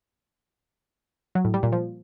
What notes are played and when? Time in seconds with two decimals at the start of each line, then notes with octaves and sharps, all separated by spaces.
1.35 F#3
1.45 A2
1.54 G3
1.63 A#2
1.72 F3